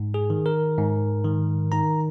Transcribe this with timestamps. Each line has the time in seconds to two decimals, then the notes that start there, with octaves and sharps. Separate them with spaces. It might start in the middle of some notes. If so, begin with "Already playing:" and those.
Already playing: G#2
0.14 G#4
0.30 D#3
0.46 A#4
0.78 G#2
1.24 D#3
1.72 D#3 A#5